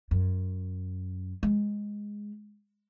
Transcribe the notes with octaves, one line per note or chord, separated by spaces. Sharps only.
F#2
G#3